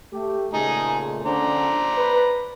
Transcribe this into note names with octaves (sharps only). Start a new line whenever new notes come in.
A3 G4
A#2 C#3 A3 D#4 G#4
D3 C#4 D4 C5 D5 A#5
B4